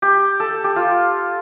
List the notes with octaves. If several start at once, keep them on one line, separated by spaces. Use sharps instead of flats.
G4
A4
G4
F4